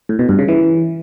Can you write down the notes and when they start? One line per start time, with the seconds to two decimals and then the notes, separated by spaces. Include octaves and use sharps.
0.09 A2
0.19 B2
0.29 G2
0.39 C#3
0.48 E3